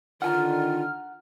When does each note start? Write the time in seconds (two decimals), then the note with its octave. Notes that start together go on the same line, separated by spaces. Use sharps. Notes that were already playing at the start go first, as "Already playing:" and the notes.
0.22 D3 D#3 F4 F#5 G#5 A#5 F6